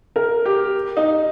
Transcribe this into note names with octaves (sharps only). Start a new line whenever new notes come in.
A#4
G4
D#4